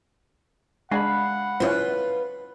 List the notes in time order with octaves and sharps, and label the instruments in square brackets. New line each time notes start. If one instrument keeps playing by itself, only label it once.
[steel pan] G#3 D4 G#5 [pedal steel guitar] F5 B5 [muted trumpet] F#5
[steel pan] C#4 E4 C5 [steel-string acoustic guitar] F4 B4